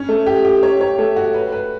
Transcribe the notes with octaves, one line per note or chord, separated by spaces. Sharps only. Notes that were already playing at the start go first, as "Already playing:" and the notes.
Already playing: C#4
A3
G4
G4
C#5
C#5
A3
F#4
B4
B4